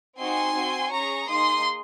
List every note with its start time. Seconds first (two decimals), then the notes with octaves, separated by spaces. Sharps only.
0.19 C4 D#4 F#4 G#5 C6
0.56 C4 F#4
0.92 C#4 G#4 A#5 C#6
1.28 A#3 D#4 G#4 C6 D#6